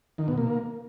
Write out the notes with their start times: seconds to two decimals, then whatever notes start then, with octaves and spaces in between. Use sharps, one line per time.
0.18 D#3
0.28 B2
0.38 A#3